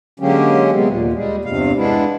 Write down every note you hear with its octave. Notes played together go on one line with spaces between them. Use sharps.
D3 F#3 G#3 A#3 C#4 G4
C3 G#3 B3
D#2 A#2
G3 G#3
E2 G2 C3 F5
G#3 B3 D4 E4